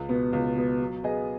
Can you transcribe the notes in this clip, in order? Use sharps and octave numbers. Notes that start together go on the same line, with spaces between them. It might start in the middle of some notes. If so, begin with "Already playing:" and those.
Already playing: C#2
B2 B3
C#2
B2 B3
F#3
B3 G#4 D#5